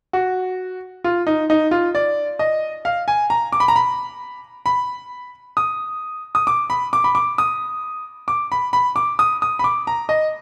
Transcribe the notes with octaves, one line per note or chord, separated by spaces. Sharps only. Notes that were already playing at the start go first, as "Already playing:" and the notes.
F#4
F4
D#4
D#4
F4
D5
D#5
F5
G#5
A#5
D6
B5
A#5
B5
B5
D#6
D#6
D6
B5
D6
B5
D6
D#6
D6
B5
B5
D6
D#6
D#6
B5
D6
A#5
D#5